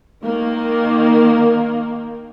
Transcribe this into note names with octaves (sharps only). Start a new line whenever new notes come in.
D#3 A#3 A#4